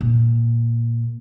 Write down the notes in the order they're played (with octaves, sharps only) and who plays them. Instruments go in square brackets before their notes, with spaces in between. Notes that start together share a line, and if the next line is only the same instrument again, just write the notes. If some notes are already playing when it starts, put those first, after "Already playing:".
[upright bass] A#2